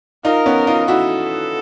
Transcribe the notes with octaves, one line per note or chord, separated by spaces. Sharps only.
D#4 F4 A#4
B3 C#4
D#4 F4
E4 F#4 A4